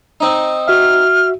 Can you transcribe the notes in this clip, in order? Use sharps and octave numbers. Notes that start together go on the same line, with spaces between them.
C4 D#4
F#4 E5 F6